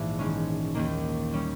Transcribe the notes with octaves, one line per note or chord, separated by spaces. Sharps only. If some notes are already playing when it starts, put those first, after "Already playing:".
Already playing: A#1 G#2 E3
D#3 G#3 C#4
D#2 D#3 A#3
G3 C#4